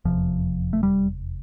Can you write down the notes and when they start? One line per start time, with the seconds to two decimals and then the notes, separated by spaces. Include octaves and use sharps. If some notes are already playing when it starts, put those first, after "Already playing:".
0.05 F1 E2 C3 F3
0.73 A3
0.83 G3